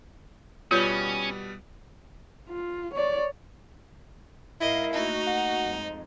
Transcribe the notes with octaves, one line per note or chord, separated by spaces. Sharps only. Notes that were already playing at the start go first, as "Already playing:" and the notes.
B2 G3 B3 C#4 F4 C#5 G6
F4
C#5 D5
G#2 E4 A#4 D#5 F5
A3 A#3 D#4 F#4
F#5
F2 G#3